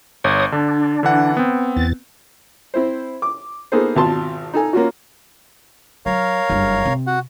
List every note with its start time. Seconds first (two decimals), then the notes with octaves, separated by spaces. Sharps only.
0.24 G1 C#5 D#6
0.52 D3 D4
1.03 D3 E3 F#5
1.37 B3 C4
1.76 E2 A6
2.74 C4 E4 C5
3.22 D6
3.72 A#3 B3 D#4 G#4 A4 C5
3.96 G#1 B2 F4 A5 C6
4.54 D#4 A4 G#5
4.73 A#3 C#4 F4 F#4
6.06 F#3 A#4 C#5 F5
6.50 F#1 G2
6.85 C3
7.07 F#4 F#5